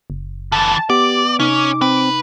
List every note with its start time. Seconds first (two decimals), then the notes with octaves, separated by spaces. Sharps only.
0.10 F#1
0.52 D3 E3 A5
0.90 B3 G4 D5 D6
1.40 C3 C#4 D#4
1.81 C4 B4